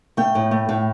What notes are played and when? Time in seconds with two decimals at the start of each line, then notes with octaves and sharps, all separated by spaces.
0.17 A3 G5
0.35 A2
0.51 A3
0.69 A2